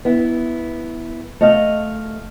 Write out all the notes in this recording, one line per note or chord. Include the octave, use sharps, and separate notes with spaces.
B3 E4
A3 D#5 F5